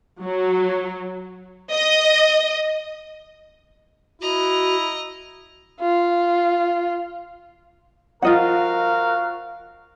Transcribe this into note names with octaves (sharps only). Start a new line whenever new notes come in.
F#3
D#5
E4 F#4 D#5 A#5
F4
F3 F4 F#4 A#4 D#5 F5 F#5